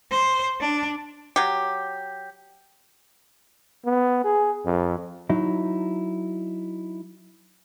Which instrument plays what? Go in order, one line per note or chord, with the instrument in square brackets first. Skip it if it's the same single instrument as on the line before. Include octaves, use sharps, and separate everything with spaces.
[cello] C5
D4
[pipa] F#3 G4
[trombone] B3
G#4
F2
[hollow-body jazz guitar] F#3 D#4 E4